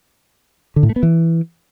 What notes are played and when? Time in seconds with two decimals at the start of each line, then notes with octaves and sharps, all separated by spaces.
0.76 D3
0.83 A2
0.89 A3
0.96 B3
1.03 E3